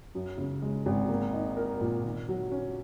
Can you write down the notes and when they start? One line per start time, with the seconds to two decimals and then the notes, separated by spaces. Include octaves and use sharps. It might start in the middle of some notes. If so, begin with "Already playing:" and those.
0.15 F#2
0.38 C#3
0.62 G#3
0.86 G#1
1.09 A#3
1.33 D#4
1.57 A#4
1.81 A#2
2.04 D#3
2.29 F#3
2.52 C#4